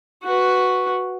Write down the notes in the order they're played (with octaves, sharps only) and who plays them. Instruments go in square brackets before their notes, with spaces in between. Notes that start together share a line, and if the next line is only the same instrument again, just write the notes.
[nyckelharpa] F#4 B4